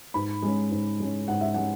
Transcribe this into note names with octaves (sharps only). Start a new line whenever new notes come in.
G#2 B5
G#3 C#4
G#2
G#3 C#4
G#2 F#5
E5
G#3 C#4 F#5